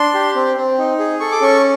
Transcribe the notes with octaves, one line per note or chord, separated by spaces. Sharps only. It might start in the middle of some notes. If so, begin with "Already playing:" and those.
Already playing: D4 C6
G4
C4
C4
D#4
G#4
A4 C#6
D6
C#4 C#6